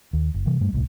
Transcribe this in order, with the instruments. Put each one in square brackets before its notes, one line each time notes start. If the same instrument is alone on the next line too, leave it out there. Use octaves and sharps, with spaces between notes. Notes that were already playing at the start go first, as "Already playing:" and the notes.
[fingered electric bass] D#2
F#1
C3 E3 G3
G2 G3 A3
D1 C2 A2